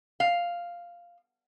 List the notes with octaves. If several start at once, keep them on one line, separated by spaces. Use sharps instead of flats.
F5